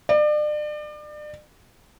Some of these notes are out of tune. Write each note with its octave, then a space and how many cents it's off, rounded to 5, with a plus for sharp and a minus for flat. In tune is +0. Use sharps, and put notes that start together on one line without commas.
D5 +35